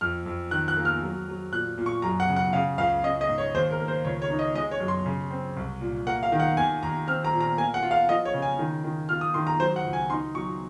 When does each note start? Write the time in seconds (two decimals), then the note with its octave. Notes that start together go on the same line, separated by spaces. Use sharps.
0.01 F2 F6
0.26 F2
0.51 D#3 F#6
0.68 F#6
0.77 A#3
0.85 F6
1.03 F#3
1.28 F#3
1.52 A#2 F#6
1.78 A#2
1.86 C#6
2.02 F#2 A#5
2.20 F#5
2.29 C#3
2.36 F#5
2.53 C#3 F5
2.78 C#2 F5
3.03 C#4 D#5
3.21 D#5
3.29 G#2
3.38 C#5
3.54 D#2 C5
3.71 A#4
3.80 A#3
3.88 C5
4.05 C#2 C#5
4.22 C#5
4.30 D#4
4.39 D#5
4.55 G#3 D#5
4.71 C#5
4.80 F#2
4.88 C6
5.06 C#3
5.31 C4
5.57 C2
5.81 A#2
6.07 A#3 F#5
6.23 F5
6.32 D#3
6.40 F#5
6.57 D#2 G#5
6.83 D#2 A#5
7.07 C4 F6
7.25 A#5
7.33 A#2
7.40 A#5
7.58 A#3 G#5
7.74 F#5
7.83 F4
7.91 F5
8.08 F3 D#5
8.25 C#5
8.34 C#3
8.42 G#5
8.59 D#3
8.84 D#3
9.09 F4 F6
9.21 D#6
9.34 D#3 C6
9.47 A#5
9.60 F#3 C5
9.76 F#5
9.85 C#2
9.93 G#5
10.10 D#4 C6
10.35 F#3 C#6